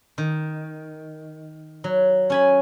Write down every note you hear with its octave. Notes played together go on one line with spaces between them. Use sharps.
D#3
F#3
C#4 G#5 B5